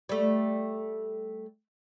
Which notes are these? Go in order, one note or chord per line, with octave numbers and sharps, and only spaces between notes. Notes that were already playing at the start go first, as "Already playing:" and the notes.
G3 A3